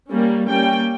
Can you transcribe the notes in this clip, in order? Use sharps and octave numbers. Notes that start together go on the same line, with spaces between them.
G3 A#3 C#4
G3 A#3 C#4 G5